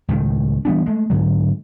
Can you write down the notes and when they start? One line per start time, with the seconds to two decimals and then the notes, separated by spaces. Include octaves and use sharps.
0.09 C#2 A2 D#3
0.65 E3 G3 B3 D4
0.86 G#3 A3
1.10 G#2 D3 F#3